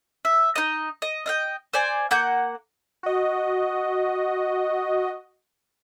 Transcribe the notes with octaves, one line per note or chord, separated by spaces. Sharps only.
E5
D#4 D#5
D#5
D#5 F5 G5
C5 D5 G#5
A#3 F#5 G6
F#4 D#5